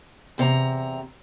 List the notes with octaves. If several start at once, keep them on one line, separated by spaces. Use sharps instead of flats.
E2 C3 B4 A#5